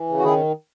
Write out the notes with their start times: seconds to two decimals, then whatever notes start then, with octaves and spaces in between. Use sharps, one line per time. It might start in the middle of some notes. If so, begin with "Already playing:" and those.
Already playing: E3
0.09 C#3
0.19 F#4
0.23 D#3 E4 G#4